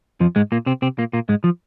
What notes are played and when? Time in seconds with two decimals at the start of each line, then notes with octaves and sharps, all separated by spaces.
0.20 F2 F3
0.36 G#2 G#3
0.52 A#2 A#3
0.66 C3 C4
0.82 C3 C4
0.98 A#2 A#3
1.13 A#2 A#3
1.29 G#2 G#3
1.44 F3